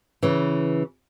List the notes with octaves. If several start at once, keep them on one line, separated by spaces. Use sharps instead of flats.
C#3 E3